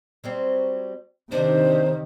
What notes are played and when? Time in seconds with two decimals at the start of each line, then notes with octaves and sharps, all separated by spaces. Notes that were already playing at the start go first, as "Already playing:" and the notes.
0.24 F#3 G3 C4
1.32 C3 D#3 D4 D#4 C5